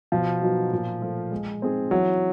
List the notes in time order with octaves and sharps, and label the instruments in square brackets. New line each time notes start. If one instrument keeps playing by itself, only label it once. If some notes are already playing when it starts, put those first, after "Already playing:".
[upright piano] B2 [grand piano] F3
[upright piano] F#3 B3 D#4 F#4
A#2
F3 A3
G#3
C4 D#4 G#4
[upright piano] E3 [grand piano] F#3